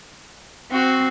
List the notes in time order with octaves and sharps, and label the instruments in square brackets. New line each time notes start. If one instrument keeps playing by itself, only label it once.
[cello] C4 [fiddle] F#4